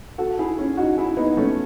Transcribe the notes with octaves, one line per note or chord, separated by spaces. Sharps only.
F#4 A4
E4 G#4
C#4 E4
D#4 F#4
E4 G#4
B3 D#4
A3 C#4